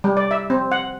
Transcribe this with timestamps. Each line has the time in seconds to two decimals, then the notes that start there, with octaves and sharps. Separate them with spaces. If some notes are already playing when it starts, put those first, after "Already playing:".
0.04 G3
0.17 D5
0.31 E5
0.50 C4
0.72 F#5